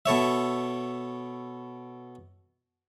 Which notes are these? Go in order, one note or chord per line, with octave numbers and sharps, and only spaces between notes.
B2 A4 C#5 E5